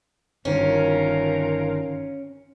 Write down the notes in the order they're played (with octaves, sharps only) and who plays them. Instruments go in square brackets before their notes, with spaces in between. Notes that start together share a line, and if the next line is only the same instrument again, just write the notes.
[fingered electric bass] G1 D#3 [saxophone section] D2 F4 A#4 [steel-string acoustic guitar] C#4